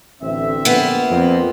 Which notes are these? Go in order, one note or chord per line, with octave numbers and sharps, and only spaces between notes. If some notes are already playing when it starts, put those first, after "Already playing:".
A1 D3 C4 E5
A#1 A#3 B3
F2 C4